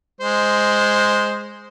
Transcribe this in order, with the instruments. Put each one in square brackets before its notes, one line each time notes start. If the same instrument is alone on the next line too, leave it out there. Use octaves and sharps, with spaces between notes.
[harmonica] G#3 C5